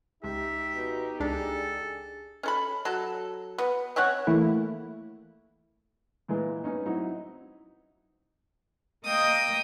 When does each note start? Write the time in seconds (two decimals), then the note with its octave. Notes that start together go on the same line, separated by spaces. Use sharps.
0.24 C#2 D#4 G4 E5
0.75 B2
1.20 C#2 D4 G#4 A4
2.43 C#4 A4 B5
2.85 F#3 A4
3.58 B3
3.96 C4 C#4 C#5 F#5
4.27 E3 A3 A#3 E4
6.28 A#2 E3 G#3
6.64 B3 C#4 D#4
6.86 F#3 C4 D#4 E4 F#4
9.05 A#3 D#5 G5 D#6